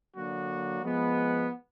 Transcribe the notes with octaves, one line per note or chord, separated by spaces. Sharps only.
D3 F#3 A#3 D4 F#4
F3 G#3 B3